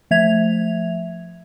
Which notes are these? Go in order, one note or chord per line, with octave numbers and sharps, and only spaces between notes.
F3 A3 E5 G#6 F7